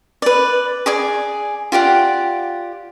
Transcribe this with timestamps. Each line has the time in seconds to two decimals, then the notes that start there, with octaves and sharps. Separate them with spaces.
0.22 B4 D5
0.86 G#4 D5 G#5
1.72 F4 G4 D5 F#5